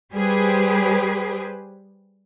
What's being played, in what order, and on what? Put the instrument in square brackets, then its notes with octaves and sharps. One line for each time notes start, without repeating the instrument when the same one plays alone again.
[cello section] G3 G4 G#4 B4 C5